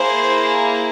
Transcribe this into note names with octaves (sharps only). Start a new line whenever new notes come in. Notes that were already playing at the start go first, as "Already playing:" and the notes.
Already playing: A#3 E4 G#4 C5